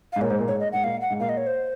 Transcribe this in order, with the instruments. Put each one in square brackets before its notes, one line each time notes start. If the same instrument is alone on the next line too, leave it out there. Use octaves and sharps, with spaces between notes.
[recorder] F5
[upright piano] G#2
[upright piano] A#2 [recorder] C#5
[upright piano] G#2 [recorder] C5
[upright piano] A#2
[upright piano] G#2 [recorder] C#5
[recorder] D#5
[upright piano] G#2 [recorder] F#5
[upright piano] A#2 [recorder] F5
[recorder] F#5
[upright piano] G#2
[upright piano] A#2 [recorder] F5
[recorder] D#5
C#5
C5